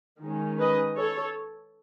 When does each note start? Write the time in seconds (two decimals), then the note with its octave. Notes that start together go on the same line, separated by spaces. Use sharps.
0.21 D#3 G#3 C#4
0.59 B4 D#5
0.97 A4 C#5